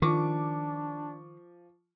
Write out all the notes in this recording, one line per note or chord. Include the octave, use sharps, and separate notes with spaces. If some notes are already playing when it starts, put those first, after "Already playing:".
D#3 F3 D4 C#6 D6